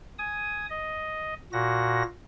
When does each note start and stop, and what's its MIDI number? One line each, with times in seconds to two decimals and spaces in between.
0.19 0.66 80
0.19 0.66 87
0.70 1.34 75
1.53 2.03 46
1.53 2.03 66
1.53 2.03 94